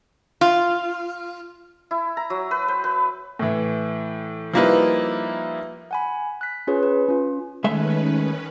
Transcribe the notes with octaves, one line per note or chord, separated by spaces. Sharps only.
F4
E4
A#5
F#3
B4
C5
B4
A2 E3
F3 G3 A#3 D#4 E4 B4
F#5 G#5 B5
F#6 B6
C#4 F4 G#4 B4 C#5
B4
C#4 F4
D#3 G#3 A3 C#4 B4 E5